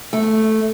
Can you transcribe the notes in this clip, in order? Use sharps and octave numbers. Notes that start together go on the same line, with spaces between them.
A3